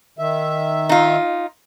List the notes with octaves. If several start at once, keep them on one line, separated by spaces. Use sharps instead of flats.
D#3 E5
D#4 F4